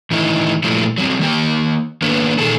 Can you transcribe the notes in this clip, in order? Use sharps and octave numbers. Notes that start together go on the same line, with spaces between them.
A2 D#3 E3 D#4 E4
A#2 F3 G3 A3 E4
F#3 G3 B3 C4
D#3 A#3 G4 G5
D#3 A#3 B3 D4 B4
A#2 D#3 G#4 A4